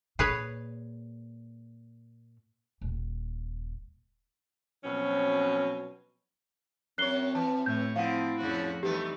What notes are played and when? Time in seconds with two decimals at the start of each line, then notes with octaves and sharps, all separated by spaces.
0.19 A#2 G#4 B4 C#5
2.81 D#1
4.84 B2 F3 F#3 C4 C#4
6.98 F#2 C4 C#5 F#6 C7 G7
7.35 E3 A5
7.66 A2 A3 C#5 G6
7.96 F3 C4 E4 F5 F#5
8.40 F2 C#3 F3 F#4
8.83 E3 G3 A3 B3 D#4 G4